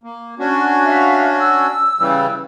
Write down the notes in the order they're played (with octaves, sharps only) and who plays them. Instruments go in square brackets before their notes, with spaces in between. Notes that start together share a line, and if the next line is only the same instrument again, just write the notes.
[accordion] A#3
C#4 D4 F#4
[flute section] E5 F5
E6
[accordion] C#3 E3 G3